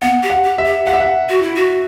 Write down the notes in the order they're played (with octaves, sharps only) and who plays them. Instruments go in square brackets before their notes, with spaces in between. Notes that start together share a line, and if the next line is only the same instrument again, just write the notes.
[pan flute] B3 [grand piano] F#5
[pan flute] G4
[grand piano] F#5
[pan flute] G4
[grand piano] E5
[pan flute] G4
[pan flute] G4 [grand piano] F#5
[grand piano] E5
F#5
[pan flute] F#4
E4
F#4